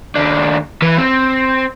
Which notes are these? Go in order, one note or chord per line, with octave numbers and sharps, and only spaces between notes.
D#2 D4
E3 B4
C4